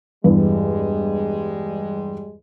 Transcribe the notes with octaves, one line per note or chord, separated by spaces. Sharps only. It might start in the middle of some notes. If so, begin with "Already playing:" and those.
E2 G2 G3 G#3